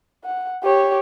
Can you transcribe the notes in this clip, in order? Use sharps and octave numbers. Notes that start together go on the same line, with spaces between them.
F#5
G4 C#5